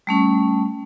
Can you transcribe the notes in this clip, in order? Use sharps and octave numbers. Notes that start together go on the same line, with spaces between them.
G3 A3 C#4 C#6